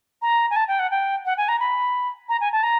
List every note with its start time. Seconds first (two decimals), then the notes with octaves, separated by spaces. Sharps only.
0.22 A#5
0.51 G#5
0.56 A5
0.68 G5
0.79 F#5
0.91 G5
1.26 F#5
1.37 G#5
1.48 A#5
1.60 B5
2.29 A#5
2.41 G#5
2.52 A5
2.63 A#5